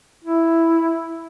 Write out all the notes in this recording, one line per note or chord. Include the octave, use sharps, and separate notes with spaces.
E4